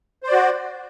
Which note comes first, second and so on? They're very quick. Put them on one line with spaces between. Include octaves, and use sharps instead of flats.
C5 D5 F#4